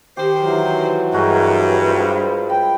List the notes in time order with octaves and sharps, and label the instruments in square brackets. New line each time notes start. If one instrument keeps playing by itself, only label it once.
[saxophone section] D#3 C5 [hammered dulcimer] G4
[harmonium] E3 F#3
[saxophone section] G2 [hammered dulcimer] G#3 F#4 A#4
[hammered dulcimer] F4 C5 B5
[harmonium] G5 [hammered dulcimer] B5